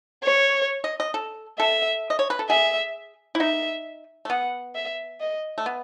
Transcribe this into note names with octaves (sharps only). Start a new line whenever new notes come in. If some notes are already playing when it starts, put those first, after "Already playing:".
C#5
D#5
D#5
A4
A4 E5
D#5
C#5
B4
A4
G#4 E5
E4
D#4 E5
A3
B3 F#5
E5
D#5
A3
B3